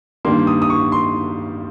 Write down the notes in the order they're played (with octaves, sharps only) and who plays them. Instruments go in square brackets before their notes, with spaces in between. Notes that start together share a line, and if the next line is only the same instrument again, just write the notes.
[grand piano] G2 D#3 G3 A#3 C6
D#6
D#6
C#6
C6